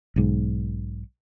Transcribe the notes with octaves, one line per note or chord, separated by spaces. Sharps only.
B1 G#2